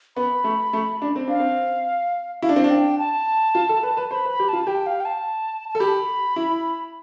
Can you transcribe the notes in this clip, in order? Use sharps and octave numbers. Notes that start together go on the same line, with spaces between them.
B3 B5
A3
A3
D4
C4
D4 F5
C4
E4 F5
D4
C4
D4
G5
A5
F4
A4
B4
B4
C5 B5
B4
B5
G4
F4 A5
G4 G5
F5
G5
A5
A5
A4
G4 B5
E4